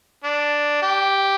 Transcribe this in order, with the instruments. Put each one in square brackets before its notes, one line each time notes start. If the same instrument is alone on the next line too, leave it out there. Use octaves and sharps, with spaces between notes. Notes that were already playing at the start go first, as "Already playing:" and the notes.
[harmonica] D4
G4